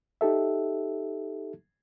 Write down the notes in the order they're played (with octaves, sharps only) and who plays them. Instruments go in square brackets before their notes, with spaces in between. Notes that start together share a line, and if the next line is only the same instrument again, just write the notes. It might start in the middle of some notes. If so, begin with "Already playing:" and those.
[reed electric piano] D#4 G4 A4 E5